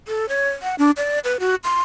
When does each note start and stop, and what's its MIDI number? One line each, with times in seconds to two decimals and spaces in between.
0.08 0.28 69
0.29 0.49 73
0.62 0.75 78
0.78 0.91 62
0.97 1.19 74
1.24 1.37 71
1.40 1.55 66
1.64 1.83 84